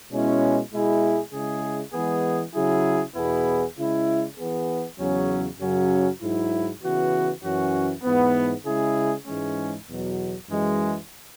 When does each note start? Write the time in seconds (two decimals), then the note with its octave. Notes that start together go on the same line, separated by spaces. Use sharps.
0.10 B2 G#3 C#4 E4
0.71 B2 G#3 E4 G#4
1.32 C#3 G#3 E4 G#4
1.94 E3 G#3 B3 G#4
2.54 C#3 F#3 E4 G#4
3.15 E2 B2 B3 E4 G#4
3.77 C#3 G#3 E4
4.37 E3 B3 G#4
4.99 E2 C#3 F#3 C#4
5.59 F#2 C#3 F#3 C#4 F#4
6.21 G#2 F#3 E4
6.82 C#3 E3 B3 F#4
7.43 F#2 E3 C#4 F#4
8.04 G#2 E3 B3
8.65 C#3 G#3 E4 G#4
9.26 G#2 E3 G#3 C#4
9.87 E2 B2 F#3
10.48 F#2 E3 G#3